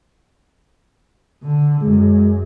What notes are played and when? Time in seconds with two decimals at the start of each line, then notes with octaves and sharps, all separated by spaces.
1.42 D3
1.82 F#2 G#3